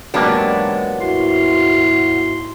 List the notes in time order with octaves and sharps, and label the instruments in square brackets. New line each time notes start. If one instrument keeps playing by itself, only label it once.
[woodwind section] G#2 E3 G#3 [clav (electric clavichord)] F#3 A#3 G4 [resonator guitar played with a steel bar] B3 D4
[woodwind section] D#2 G#2 C6 [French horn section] E4 F#4